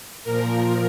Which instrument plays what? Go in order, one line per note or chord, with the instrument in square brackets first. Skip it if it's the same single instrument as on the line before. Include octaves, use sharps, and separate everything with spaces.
[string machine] A#2 F3 A#4